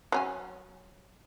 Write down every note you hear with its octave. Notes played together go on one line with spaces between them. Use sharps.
F#3 C#4 G#5